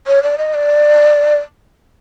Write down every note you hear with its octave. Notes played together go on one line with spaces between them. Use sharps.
C#5
D5
D#5
D5